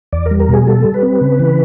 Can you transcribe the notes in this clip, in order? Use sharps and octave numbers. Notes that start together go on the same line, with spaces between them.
E2 D5
A#4
G3
A#4
B2 G#4
G3 A4
G3
B4
C4
C#3
E3